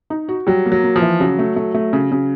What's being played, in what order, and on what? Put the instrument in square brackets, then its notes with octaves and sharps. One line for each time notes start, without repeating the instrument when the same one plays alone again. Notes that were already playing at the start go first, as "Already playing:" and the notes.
[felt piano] D#4
F#4
[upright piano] F#3 [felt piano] G3
[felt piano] A#3
[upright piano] F#3
[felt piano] A#3
[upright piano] F3
[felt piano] E3
[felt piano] C#3 [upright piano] F#3
[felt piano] A3
A3
A3
C#3
C#3